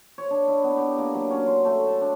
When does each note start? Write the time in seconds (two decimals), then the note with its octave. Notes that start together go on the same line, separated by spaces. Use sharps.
0.18 C#5
0.31 D4
0.48 E4
0.64 B3
0.78 G4
0.98 A#3
1.14 F#3
1.31 C#4
1.47 C6
1.65 A3
1.87 A5
2.01 D4